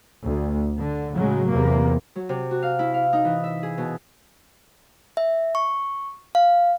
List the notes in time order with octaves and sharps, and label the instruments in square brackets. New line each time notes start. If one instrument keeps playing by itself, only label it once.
[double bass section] D2
D3
A2 C#3 F#3 G#3
E2 C3 A#3
[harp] F#3
C3
F#4
F5
E4
F5
D#4
E3
E5
G#4
B2
[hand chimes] E5
C#6
F5